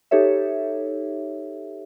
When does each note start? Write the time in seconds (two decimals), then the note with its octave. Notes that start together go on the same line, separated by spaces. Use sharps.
0.11 D#4 G4 A4 C#5 E5